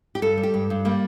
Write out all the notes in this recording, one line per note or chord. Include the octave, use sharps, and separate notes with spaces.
G4
G2 A4
G3
G4
G2
G2
G3 A#3